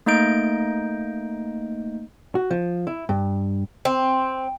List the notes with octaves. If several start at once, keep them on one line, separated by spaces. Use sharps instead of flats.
A3 A#3 D#4 D#5 G6 D7
F#4
F3
E4
G2
C4